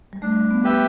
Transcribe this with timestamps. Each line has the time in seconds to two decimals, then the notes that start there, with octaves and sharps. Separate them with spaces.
0.13 G3
0.22 A3 D4
0.51 B3
0.64 G4 B4 E5 G5